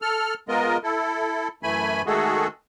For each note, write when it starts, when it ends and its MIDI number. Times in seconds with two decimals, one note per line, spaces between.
0.02 0.34 69
0.02 0.34 89
0.48 0.77 56
0.48 0.77 59
0.48 0.77 65
0.48 0.77 70
0.48 0.77 75
0.83 1.48 64
0.83 1.48 69
1.63 2.02 42
1.63 2.02 52
1.63 2.02 57
1.63 2.02 80
1.63 2.02 83
2.06 2.47 51
2.06 2.47 56
2.06 2.47 57
2.06 2.47 66
2.06 2.47 68
2.06 2.47 69